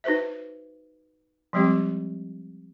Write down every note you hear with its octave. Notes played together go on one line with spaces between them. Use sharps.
D#4 F#4 B4 C5 E5
F3 G3 G#3 C4 G4